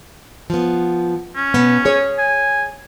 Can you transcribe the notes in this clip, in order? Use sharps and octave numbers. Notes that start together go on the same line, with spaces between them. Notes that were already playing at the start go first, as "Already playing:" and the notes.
F3 B3
C#4
B2 B3
G#4 C#5
G#5